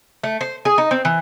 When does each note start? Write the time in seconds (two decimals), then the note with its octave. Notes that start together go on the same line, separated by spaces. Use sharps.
0.23 A3
0.41 C5
0.65 G#4
0.78 D#4
0.91 C4
1.05 E3